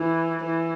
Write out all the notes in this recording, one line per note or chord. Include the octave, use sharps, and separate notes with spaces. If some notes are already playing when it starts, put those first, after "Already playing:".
Already playing: E3
E3